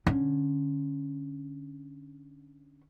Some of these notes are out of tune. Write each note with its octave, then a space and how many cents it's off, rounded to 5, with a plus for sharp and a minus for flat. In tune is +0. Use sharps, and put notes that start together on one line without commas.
D3 +0 C#4 +0